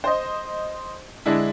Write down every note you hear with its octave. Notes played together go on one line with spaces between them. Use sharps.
C5 D#5
D3 G#3 D4 E4